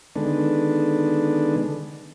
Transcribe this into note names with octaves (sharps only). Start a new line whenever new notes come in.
D3 D#3 G#3 B3 D4 A4